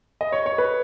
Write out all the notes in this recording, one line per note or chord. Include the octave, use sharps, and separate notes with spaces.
D#5
C#5
C#5
B4